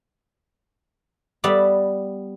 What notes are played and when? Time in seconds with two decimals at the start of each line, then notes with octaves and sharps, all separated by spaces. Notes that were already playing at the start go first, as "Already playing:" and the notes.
1.44 G3 B3 D5 E5